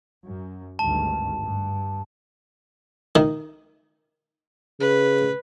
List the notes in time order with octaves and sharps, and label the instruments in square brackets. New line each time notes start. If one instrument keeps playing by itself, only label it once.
[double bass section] F#2
[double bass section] G#1 D2 G2 [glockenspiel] A5
[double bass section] G2
[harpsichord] D#3
[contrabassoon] C#3 [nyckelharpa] B4